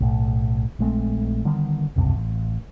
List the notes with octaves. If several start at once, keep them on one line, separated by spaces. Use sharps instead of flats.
B1 A2
A#1 G#3 A3 C4
D3 D#3 G3 B3
F1 C#2 G2 C3
A1